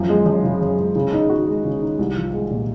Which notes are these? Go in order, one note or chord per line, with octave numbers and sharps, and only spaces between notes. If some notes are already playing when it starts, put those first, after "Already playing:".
Already playing: F#2 F3
G#3
F#2
C#3
F#2
G#3
C#3
D#4
F#4
G#3
C#3
D#4
C2
F3
G#3
A#2